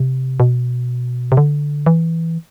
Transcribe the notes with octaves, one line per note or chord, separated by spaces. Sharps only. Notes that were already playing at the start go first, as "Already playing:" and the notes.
Already playing: C3
B2
C3
D3
E3